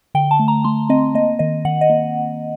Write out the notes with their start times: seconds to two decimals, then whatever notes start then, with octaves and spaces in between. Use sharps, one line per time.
0.15 D3 G5
0.31 A5
0.39 A3
0.48 A#5
0.64 A3 C6
0.89 C4 D#5
1.15 A#3 D#5
1.39 D#3 D#5
1.65 D#3 F#5
1.81 D#5
1.90 A#3